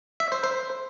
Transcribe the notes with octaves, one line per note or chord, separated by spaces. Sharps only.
E5
C5
C5